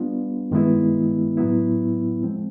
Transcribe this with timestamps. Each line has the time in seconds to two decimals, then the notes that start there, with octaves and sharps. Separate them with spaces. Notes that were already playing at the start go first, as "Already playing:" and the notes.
Already playing: G3 B3 D4 F4
0.51 G2 D#3 G#3 B3 E4
1.37 A2 F#3 B3 E4
2.23 F3 G#3 C4